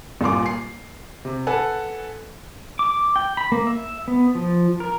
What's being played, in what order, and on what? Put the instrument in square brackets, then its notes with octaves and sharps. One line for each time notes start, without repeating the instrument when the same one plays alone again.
[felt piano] D#1 A#2 C6 D6
C7
C3
A4 B4 F#5 G#5
[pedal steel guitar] D6
G5
B5
A#3
E5
B3
F3
A#4